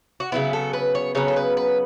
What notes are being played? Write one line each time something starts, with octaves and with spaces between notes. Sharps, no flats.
F#4
C#3 F#3 B3 E4
A4
B4
C#5
C#3 F#3 B3 C#5
A4
B4
B4